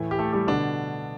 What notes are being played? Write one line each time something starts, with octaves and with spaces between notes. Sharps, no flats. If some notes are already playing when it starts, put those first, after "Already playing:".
Already playing: A2 E3 A3
G4
A3 A4
G3 G4
B2 D3 D4